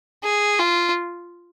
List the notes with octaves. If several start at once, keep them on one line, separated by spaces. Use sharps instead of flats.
G#4
F4